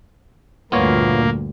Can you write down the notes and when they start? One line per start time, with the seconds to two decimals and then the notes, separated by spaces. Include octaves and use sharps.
0.72 D2 G2 A#2 A#3 B3 F4 C#5